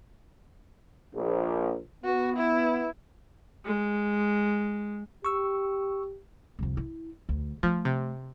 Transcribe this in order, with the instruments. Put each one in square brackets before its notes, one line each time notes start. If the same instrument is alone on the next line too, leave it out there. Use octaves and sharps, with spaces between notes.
[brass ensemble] A#1
[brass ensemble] B3 [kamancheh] F#4
[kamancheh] E4
[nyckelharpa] G#3
[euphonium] G4 [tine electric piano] C#6 E6
[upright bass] C2 F2
E4
D2
[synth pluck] F3 [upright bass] A3
[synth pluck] C3